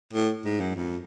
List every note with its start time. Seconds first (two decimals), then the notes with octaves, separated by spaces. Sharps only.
0.13 A2
0.45 G#2
0.60 F#2
0.75 F2